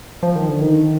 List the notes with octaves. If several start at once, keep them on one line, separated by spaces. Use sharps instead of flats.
F3
D#3
D3
D#3